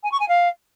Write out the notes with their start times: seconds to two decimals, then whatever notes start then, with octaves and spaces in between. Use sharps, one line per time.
0.03 G#5
0.12 C#6
0.20 G#5
0.28 F5